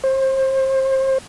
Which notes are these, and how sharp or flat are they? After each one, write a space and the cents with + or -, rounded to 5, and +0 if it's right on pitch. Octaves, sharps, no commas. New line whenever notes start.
C5 +30